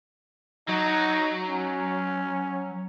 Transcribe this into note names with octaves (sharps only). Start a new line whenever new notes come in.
F#3 D#4
C#4